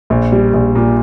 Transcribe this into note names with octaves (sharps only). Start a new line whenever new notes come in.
A#1
G3
A#1
A#2